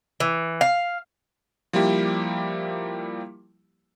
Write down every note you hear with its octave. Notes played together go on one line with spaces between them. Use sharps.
E3
F5
F3 G3 A#3 E4 G4